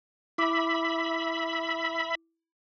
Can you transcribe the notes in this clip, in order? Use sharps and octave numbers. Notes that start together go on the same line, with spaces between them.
E4 E5 B5 D6